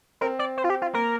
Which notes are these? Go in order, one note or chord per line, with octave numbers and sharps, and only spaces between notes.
C4 A#4
D5
C5
F4
G4
F4
A#3 A#4